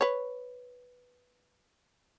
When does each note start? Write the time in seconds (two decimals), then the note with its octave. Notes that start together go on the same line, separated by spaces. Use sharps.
0.01 B4 C#5